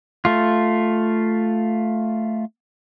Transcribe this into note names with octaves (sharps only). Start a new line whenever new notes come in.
A3 F4